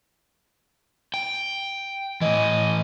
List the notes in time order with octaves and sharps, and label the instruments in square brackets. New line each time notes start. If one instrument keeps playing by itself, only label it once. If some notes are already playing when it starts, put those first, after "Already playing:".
[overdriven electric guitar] G5
[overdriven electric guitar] A2 E3 [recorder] D#5